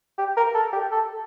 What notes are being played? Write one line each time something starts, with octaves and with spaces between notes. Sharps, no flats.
G4
A#4
A4
G4
A4